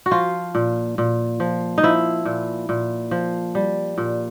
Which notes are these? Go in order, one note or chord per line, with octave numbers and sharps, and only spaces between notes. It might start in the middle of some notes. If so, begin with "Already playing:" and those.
F#4
F3 F4
A#2
A#2
F3
D#4
F3 E4
A#2
A#2
F3
G3
A#2